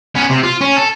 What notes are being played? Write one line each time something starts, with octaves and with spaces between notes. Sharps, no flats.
B3 C#4
C3
F4
C#4
A4